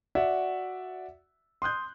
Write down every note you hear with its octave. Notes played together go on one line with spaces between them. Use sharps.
F#4 D5 E5 F#5
C6 D#6 F#6 G6